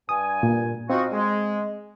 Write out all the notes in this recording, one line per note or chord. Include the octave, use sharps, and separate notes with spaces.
G2 G#5 D#6
A#2
C4 D#4 F4 F#4
G#3